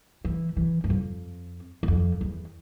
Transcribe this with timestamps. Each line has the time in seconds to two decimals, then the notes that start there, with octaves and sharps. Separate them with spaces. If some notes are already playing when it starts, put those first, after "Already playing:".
0.25 E3
0.57 E3
0.84 G2
0.90 F2
1.83 E2
1.88 F2
2.21 E2